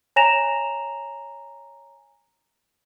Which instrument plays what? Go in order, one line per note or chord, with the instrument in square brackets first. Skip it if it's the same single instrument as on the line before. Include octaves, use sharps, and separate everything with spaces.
[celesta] C#5 G#5 A#5 A#6 E7 F7